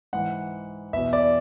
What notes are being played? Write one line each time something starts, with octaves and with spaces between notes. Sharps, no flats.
G#2 E3 F#5
E2 B2 E5
D5